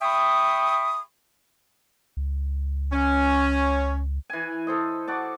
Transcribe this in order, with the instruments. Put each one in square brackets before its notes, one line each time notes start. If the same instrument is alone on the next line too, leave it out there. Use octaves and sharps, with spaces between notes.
[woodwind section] E5 G5 B5 C#6 D#6
[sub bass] C#2
[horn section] C#4
[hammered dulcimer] E3 G#5
A4 C5 D#5
F#4 D5 A5